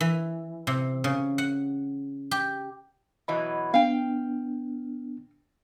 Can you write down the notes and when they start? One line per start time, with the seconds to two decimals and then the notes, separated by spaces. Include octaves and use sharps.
0.01 E3
0.67 C3
1.04 C#3
1.38 F#5
2.31 G4
3.28 B2 E3 F#3 D#5 B5
3.74 B3 D4 F5 G5